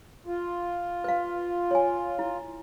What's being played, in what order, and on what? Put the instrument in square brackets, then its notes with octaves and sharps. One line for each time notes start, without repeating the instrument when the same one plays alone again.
[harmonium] F4
[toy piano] B4 F5
C#5 G#5
E4